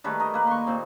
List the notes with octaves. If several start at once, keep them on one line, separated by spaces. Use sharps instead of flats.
D#3 G3 A3 B4
A#4 D#5
A#3 B4
C6 C#6
A#2 C4